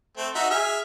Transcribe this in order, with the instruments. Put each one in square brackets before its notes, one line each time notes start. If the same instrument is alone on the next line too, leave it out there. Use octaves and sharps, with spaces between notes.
[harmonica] A3 C4
D#4 F#4 E5
G#4 E5 F6